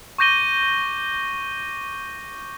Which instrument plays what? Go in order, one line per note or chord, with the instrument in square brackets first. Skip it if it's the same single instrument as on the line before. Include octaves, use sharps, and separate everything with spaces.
[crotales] C#6 D6 G6 A#6 D#7 G7